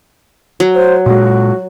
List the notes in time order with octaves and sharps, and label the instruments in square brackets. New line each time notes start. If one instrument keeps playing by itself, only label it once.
[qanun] F#3
[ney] C5
[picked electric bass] A#2 G#3 [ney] F#4